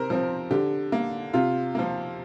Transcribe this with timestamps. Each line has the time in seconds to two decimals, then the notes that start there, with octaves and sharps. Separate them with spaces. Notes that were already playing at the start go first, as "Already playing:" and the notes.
Already playing: C3 A#4 C5
0.10 F3 C4
0.51 D3 G4
0.92 A#3
1.33 C3 F4
1.75 F3 A#3